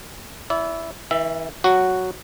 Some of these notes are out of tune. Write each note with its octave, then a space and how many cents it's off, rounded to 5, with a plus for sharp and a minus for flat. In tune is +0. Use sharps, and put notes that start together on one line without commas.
E4 +0 D5 -35
E3 -35 E5 +20
F#3 +0 F#4 +0